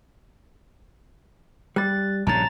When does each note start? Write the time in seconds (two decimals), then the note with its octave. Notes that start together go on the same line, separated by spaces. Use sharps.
1.76 G3 F#6 A6
2.27 A#1 G2 C#3 A5 A#5 A6